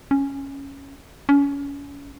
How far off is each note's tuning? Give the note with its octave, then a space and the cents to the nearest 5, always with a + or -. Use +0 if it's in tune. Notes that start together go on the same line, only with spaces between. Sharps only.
C#4 -5
C#4 +30